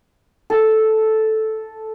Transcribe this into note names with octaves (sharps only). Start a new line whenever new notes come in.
A4